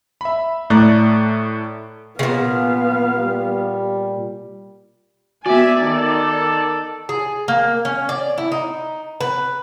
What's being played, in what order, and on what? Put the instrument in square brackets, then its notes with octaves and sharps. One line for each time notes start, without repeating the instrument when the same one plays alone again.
[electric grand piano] E5 B5
A2 A3 D5 A#5 F#6
[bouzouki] A#2 C#3 [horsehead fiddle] B3 F5
[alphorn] G3
[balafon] B3 F#4 [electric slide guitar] D5 [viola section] E5 G#5
[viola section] D#3 [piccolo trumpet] A4
[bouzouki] G#4
A#3
C#4
D5
E4
D#4
B4